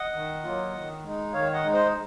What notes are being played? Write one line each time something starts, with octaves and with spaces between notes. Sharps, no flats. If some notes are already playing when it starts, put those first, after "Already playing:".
Already playing: D#5 F#5
D#3
F#3 A#3 F4
D#3
G#3 D#4
D#3 C#5 F5
D#5 F#5
G#3 D#4
C5 D#5